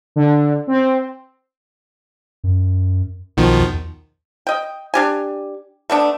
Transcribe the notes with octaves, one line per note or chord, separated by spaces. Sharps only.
D3
C4
F#2
B1 B2 D#3 F3
E2
D#5 G5
D4 G4 G#5
A3 B3 D4